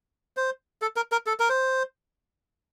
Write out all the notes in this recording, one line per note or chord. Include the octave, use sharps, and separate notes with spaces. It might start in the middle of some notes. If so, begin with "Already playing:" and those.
C5
A4
A#4
A#4
A4
A#4
C5